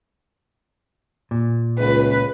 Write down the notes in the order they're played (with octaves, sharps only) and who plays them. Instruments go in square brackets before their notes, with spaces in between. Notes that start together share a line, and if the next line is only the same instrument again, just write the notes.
[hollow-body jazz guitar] A#2
[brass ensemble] C#2 [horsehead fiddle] B4